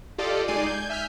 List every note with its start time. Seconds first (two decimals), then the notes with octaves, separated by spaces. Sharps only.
0.18 F4 G4 A4 D5 D#5 F5
0.48 G#3 D#4 D5 G#5 C7 D#7
0.66 G6 G#6
0.90 E5 G#5 F6 G6 B6